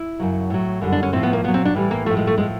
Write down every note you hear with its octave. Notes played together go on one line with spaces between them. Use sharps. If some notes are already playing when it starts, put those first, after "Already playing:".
Already playing: E4
F#2 C#3 F#3
A2 F#3
F#2 D3 G3
D4
C#4
A2 F3 C4
B3
A#3
A#2 F#3 B3
C4
D4
A2 E3 G3
A#3
A2 F3 A3
G#3
A3
A2 F3 G#3